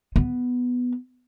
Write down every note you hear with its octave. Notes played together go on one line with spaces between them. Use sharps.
B3